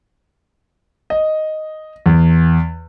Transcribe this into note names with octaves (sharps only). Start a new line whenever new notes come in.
D#5
E2